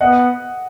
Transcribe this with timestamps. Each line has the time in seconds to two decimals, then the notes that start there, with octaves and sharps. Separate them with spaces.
0.01 B3 D#5 F#5